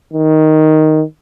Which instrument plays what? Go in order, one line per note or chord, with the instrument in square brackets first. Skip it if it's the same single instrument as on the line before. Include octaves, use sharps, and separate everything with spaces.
[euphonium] D#3